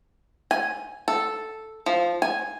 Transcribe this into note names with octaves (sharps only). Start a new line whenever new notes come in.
G#5
A4
F3
G#5